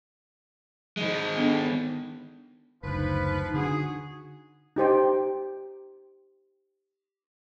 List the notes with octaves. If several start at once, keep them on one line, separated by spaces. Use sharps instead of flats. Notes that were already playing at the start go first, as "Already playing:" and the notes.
D#3 G#3
B3 D4 A4
F#1 D2 F3 D#4 B4
D3 C#4 D4 F#4 G#4
D#4 G4 C5 G5